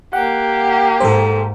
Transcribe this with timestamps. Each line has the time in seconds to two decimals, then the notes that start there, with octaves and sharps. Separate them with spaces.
0.13 A#3 G4 F#5
1.00 G#2 A4 C5